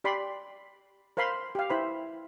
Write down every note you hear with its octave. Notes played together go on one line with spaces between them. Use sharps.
G4 D5 B5 C6
A#4 C5 F5 B5 C6
G4 F5
E4 C5 B5